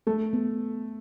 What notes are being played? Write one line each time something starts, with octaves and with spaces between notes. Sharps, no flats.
A3 A4
B3